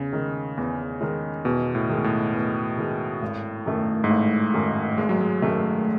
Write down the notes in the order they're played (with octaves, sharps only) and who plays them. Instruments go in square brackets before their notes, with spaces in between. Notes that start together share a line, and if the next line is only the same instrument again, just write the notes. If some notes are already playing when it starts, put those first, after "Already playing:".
Already playing: [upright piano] E2 [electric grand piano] C#3
[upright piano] D#3 G#3
E2
D#3 G#3
[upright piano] E2 [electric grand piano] B2
[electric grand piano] A2
[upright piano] D#3 G#3
[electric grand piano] A2
[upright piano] E2
D#3 G#3
G#1
F#2 D#3 A3
[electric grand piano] G#2
[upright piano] G#1 [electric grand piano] A2
[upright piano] F#2 D#3 A3
[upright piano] G#1 [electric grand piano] G#3
[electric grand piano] F#3
G#3
[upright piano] F#2 D#3 A3